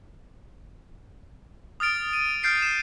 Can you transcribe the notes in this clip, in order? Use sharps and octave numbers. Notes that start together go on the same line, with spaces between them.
D#6 F6 A6 D7
D#7
F6 G6 A6 C7 D7
E7